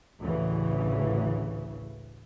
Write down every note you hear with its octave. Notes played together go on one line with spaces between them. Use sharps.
A1 D2 C#3 E3